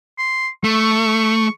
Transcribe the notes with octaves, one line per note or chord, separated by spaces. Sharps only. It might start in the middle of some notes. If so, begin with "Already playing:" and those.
C6
A3 C#6